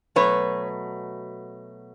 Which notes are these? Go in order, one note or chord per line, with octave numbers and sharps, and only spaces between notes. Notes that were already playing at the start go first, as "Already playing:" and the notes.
B2 F#3 A3 B4 C#5